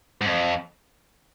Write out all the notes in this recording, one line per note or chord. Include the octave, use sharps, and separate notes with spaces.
G#2
F2